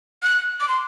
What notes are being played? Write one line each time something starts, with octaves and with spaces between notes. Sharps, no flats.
F#6
D6
C6